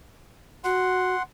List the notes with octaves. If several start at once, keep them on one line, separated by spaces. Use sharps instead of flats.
F#4 F#5 C6